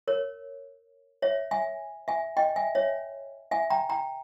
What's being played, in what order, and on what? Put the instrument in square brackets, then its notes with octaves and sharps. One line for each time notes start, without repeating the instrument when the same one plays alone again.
[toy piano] A#4 C#5
C#5 E5
E5 G#5
E5 G#5
D#5 G5
E5 G#5
C#5 E5
E5 G#5
G5 A#5
G5 A#5